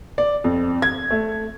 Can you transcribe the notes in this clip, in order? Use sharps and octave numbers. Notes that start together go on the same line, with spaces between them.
D5
F2
G#6
A3